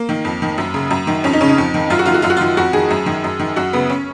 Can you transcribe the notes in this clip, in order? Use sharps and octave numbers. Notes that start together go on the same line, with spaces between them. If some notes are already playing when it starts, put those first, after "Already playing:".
Already playing: A#3
D#3
F2
D#3
F#2
C#3
F#2
D#3
F2 C#4
D#4
C#3 C#4
D#4
F2
D#3
F#2 F4
F#4
D#3 F4
F#4
F#2 F4
F#4
D#3 F4
F2 F#4
D#3 G#4
F#2
D#3
F#2
D#3
F#2 F#4
C#3 B3
C#4